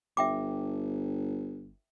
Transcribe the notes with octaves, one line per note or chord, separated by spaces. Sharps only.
G1 E5 G5 D6